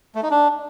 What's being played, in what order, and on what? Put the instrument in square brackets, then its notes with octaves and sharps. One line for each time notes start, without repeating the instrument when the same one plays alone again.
[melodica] A3
D#4
D4